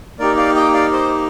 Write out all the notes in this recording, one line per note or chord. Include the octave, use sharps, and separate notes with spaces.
A#3 D#4 G4 A#4 D5
D5 F5
D#5 G5
D5 F5
C5 D#5